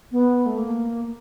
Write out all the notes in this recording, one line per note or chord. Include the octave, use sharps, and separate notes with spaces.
B3
A3
A#3